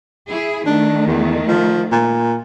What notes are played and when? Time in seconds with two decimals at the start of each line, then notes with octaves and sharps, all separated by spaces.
0.29 E4 G#4
0.66 D#3 A3 D4
1.07 E2
1.48 F3
1.92 A#2